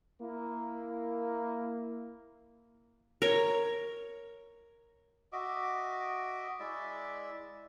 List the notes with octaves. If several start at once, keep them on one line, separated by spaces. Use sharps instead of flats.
A#3 E4
A#4 C#5
F#4 D#5 E5 D6
G#3 E4 D5 E5